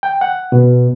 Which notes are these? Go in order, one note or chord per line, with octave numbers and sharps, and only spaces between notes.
G5
F#5
B2